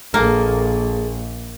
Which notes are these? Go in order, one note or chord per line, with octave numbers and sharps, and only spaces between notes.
A#1 A#3 G#4 A4